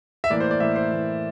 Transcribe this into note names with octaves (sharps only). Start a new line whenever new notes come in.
E5
A2 E3 A#3 D5
C5
D5
A2 E3 A#3 E5
C5
A2 E3 A#3